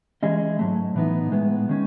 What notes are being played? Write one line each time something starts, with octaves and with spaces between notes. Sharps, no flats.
E3 G#3 C#4 G#4 D#5
G#2 F#3 A3
A2 E3 B3 D#4
A2 G#3 B3
D#3 G#3 C#4